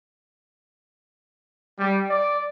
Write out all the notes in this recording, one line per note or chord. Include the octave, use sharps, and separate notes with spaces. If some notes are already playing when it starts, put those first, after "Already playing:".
G3
D5